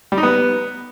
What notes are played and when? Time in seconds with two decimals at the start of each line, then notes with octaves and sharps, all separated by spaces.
0.12 G3
0.17 D#4
0.23 B3